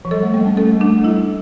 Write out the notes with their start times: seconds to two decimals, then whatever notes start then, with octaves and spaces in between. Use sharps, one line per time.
0.05 F3
0.11 G3 A4
0.23 A3
0.34 G3 A#3
0.46 C#4
0.57 A3 A4
0.72 G3
0.81 A3 D4
0.98 A3
1.04 G3 E4